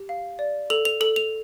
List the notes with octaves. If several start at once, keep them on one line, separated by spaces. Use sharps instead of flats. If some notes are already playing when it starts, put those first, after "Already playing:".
Already playing: G4
F5
D5
A4 F7
F7
A4 F#7
F7